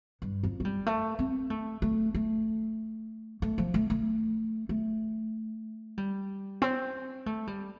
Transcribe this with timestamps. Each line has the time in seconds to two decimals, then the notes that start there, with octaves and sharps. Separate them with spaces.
0.22 G2
0.43 F2
0.60 A3
0.65 G3
0.86 A3
1.19 C4
1.50 A3
1.82 A3
2.14 A3
3.42 A3
3.58 F3
3.74 A3
3.90 A3
4.69 A3
5.98 G3
6.62 C4
7.26 A3
7.47 G3